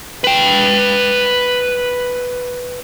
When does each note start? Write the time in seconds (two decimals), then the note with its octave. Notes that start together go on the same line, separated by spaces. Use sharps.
0.24 B4 G5